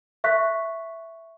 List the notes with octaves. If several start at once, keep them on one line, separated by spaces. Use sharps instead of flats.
E5 C#6 F#6 B6